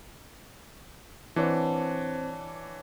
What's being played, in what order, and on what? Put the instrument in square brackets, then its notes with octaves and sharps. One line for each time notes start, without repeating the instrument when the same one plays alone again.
[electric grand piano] E3 [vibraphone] C4 C5 [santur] D4 C#5 F#5